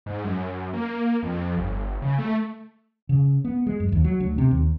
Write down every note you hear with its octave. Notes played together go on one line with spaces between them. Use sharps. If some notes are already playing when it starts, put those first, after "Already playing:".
G#2
F#2
A#3
F2
G1
C#3
A3
C#3
B3
G#3
F#2
D#2
F#3
D2
C3
D#2